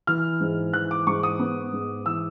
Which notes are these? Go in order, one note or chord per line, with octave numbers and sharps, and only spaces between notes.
E3 F6
G#2
E3 F#6
D6
G#2 C#6
D#6
B3
G#2
E3 E6